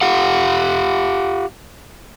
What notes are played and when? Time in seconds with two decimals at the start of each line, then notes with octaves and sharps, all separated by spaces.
0.01 F4 G4 F5 F#5